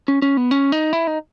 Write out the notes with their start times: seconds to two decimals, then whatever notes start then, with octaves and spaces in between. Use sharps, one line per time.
0.08 C#4
0.22 C#4
0.37 B3
0.51 C#4
0.72 D#4
0.93 E4
1.07 D#4